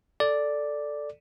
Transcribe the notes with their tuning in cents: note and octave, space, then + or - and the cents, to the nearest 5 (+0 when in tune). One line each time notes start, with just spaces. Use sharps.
A4 +0 D5 +0